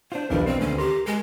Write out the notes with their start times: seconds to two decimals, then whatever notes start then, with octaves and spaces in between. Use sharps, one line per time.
0.12 D4 F4 C5
0.30 B1 E2 D#3 F3 G3 D4 A#4 B4
0.46 C4 C5
0.60 D2 C#4
0.78 G4 A#4 C6
1.06 G#3 G#4 A#4 G#5